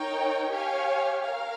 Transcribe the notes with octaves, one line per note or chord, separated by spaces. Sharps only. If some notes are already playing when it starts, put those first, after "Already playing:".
Already playing: D#4 A#4 C#5 G5
G4 C#5 F5 G#5
A#4 F5